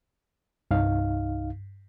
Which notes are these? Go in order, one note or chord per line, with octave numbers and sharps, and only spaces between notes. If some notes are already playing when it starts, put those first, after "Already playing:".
C2 G2 D#4 F5